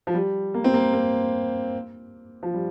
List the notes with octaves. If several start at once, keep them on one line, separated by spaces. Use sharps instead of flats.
F3
G3
A#3
C4
A#3
A#3
F3
G3